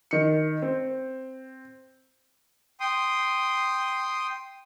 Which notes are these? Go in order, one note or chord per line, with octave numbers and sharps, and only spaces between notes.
D#3 C#7
C4
G5 C6 D#6